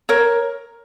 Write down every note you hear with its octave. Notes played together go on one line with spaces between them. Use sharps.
A#4 C#5